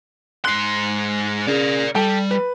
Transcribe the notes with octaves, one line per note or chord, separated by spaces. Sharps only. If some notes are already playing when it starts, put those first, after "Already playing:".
G#2 C6 F#6 C7
C#3 A#4 D5
G3 A4 G5
B4